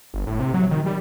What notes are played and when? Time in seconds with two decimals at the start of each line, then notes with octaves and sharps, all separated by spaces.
0.14 G1
0.27 A2
0.40 C3
0.54 F#3
0.71 D#3
0.86 G3